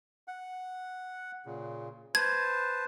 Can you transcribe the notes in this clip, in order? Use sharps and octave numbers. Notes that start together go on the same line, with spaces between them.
F#5
A#2 C#3
B4 C5 A5 G#6